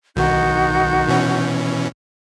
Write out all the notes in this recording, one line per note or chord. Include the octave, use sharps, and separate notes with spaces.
B1 D#3 D#4 F#4 G6
B2 E3 C#4